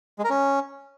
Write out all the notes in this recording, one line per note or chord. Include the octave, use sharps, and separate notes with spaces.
G#3
A#4
C#4